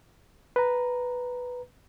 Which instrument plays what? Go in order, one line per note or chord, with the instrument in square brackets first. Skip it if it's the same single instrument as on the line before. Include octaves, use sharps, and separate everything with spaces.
[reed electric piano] B4 A#5